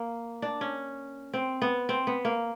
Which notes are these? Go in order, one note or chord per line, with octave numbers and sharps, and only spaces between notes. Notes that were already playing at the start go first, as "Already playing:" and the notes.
Already playing: A#3
D4
C#4
C4
B3
C4
B3
A#3